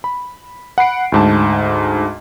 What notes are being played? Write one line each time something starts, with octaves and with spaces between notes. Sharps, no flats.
B5
F#5 B5 C7 D7
D2 G#2 A5